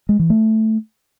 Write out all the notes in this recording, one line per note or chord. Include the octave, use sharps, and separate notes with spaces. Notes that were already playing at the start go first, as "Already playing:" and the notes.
G#3
E3
A3